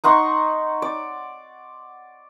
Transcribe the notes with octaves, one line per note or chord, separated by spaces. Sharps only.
D#4 F#5 C6 C#6
D5